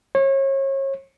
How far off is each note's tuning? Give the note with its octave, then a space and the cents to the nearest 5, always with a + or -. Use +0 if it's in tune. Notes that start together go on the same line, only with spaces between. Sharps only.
C#5 -35